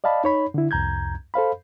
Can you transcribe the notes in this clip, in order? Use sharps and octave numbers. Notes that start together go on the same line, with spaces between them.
D5 D#5 F5 A5 B5
D#4 C#5 B5
D3 E4
C2 F2 A#5 G6 G#6
A4 C5 F5 B5